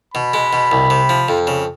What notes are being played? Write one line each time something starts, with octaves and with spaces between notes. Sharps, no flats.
B2 B5
G#3
B2
C2
C3
F3
F2
C#3